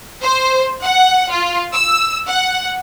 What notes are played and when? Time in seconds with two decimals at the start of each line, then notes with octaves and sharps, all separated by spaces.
0.22 C5
0.82 F#5
1.31 F4
1.73 E6
2.28 F#5